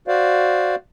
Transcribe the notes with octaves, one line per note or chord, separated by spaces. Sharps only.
F#4 C5 D5 F5